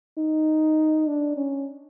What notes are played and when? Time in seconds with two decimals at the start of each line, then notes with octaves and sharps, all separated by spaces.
0.18 D#4
1.07 D4
1.37 C#4